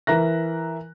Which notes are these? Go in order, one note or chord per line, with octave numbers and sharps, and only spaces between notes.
E3 A#4 E5 A#5 F#6 A#6